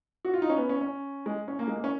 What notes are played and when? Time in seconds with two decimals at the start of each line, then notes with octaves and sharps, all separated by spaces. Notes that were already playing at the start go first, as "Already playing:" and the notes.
0.25 F#4
0.33 F4
0.42 D#4
0.50 C#4
0.57 B3
0.69 C#4
0.81 C#4
1.26 G#3
1.48 C#4
1.59 A#3
1.68 G#3
1.76 A#3
1.84 C#4